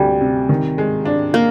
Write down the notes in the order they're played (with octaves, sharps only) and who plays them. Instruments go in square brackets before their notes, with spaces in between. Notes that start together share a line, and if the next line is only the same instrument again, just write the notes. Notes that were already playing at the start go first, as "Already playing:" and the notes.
Already playing: [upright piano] D2 C3 [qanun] G3
[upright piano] C3
D#3
G#3
D4
[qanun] A#3